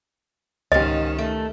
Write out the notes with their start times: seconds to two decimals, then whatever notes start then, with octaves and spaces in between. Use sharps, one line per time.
0.72 C#2 G#2 D#3 C#4 G4 D#5 F5
1.18 A3